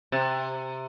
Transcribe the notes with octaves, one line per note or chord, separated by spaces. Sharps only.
C3